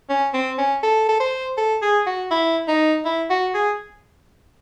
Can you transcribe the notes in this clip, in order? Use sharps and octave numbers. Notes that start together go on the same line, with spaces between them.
C#4
C4
C#4
A4
A4
C5
A4
G#4
F#4
E4
D#4
E4
F#4
G#4